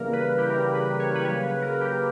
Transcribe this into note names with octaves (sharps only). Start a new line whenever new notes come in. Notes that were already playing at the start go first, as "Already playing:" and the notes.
Already playing: C#3 E3 G3 A#3 A#4
B4
G4
C#3 E3 G3 A#3 A#4
B4
C#5
B4
C#3 F#3 A#3 C#5
B4
A#4
G4